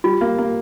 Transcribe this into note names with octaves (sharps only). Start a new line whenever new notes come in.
G3 F4
A#3
A#3